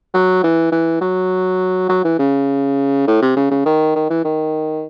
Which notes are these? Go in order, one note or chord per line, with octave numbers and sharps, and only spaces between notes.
F#3
E3
E3
F#3
F#3
E3
C#3
A2
C3
C#3
C#3
D#3
D#3
E3
D#3